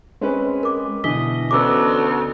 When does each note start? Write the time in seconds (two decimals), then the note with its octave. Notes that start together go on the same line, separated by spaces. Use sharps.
0.21 G#3 C4 C#4 B4
0.63 A#4 D6
1.04 B2 D3 E3 D4 D#5 B6 G7
1.51 D2 B3 C#4 D4 D6 E6